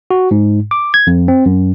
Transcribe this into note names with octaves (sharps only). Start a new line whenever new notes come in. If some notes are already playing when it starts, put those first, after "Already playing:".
F#4
G#2
D6
G#6
F2
C4
F#2